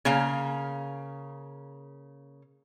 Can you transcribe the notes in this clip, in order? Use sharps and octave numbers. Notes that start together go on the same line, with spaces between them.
C#3 A#3 F5